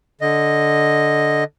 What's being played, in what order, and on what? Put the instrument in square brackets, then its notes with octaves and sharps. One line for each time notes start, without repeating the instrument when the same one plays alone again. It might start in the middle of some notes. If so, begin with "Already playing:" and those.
[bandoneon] D3 D#5